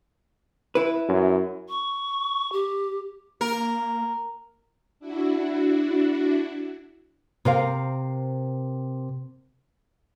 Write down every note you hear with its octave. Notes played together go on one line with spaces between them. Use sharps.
E4 B4
F#2
C#6
G4
A#3 A#4
D4 E4 F#4
C3 A#4 C5 F5